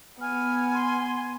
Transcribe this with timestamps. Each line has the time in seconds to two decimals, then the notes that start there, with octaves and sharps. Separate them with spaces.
0.21 B3 G#5 F6
0.74 C6